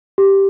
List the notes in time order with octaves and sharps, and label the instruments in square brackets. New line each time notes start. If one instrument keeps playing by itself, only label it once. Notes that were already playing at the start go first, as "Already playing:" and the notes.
[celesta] G4